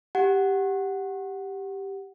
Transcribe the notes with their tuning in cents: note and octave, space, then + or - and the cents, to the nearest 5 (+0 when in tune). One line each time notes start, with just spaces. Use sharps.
G4 +0 F#5 +0